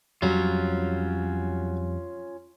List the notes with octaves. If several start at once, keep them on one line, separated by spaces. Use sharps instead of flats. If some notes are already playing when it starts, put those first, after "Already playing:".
F2 F#3 G3 C#4 F4